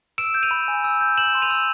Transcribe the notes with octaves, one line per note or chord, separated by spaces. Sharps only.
E6 D7 E7
G6
D#7 F7
B5
G#5
E6
G6
G6 E7 F#7
C6
D#7 F7
E6